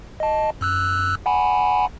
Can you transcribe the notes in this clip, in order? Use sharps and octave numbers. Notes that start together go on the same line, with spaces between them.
D#5 A5
F#2 E6 F#6
F#5 G#5 B5